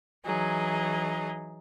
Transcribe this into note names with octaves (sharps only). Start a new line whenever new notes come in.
E3 F#3 D#4 G#4